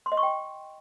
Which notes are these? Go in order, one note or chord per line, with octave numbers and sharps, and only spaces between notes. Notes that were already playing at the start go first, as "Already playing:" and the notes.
C6
D#5
C#6
G5